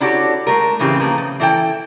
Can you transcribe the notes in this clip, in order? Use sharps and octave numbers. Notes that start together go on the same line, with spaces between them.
D4 E4 F#4 G4 A4 C#5
G#3 A3 A#4
A2 C#3 E3 C4 D#4 G4
F3 A3 A#3 B4
C#3
E3 E4 A4 B4 G5